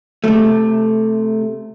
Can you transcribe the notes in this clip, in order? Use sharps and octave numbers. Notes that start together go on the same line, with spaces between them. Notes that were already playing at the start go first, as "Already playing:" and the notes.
C3 A3